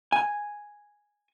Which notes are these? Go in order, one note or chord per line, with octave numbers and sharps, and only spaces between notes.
G#5